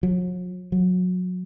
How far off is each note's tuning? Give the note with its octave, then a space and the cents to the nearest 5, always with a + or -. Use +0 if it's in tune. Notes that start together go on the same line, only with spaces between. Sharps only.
F#3 -45
F#3 -25